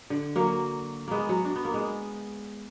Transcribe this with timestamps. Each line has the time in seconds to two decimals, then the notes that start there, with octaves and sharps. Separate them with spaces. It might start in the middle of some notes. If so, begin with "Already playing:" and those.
0.10 D3
0.36 F#3 A#3
1.08 G#3 A#3 B3
1.29 F#3
1.45 D4
1.56 B3
1.65 A#3
1.74 G#3 B3